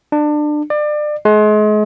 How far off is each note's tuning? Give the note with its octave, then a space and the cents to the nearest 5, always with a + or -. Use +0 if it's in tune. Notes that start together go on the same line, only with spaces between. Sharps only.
D4 +25
D5 +30
G#3 +35